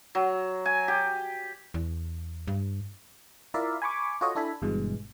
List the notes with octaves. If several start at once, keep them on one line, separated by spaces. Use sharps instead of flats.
F#3
G#5
G4
E2
G2
E4 F4 A#4 D5 E5 F5
G#5 B5 C#6 D6
F4 F#4 A4 C#5 D#5
D4 E4 A4 G#5 B5
G1 G2 B2 E3 G#3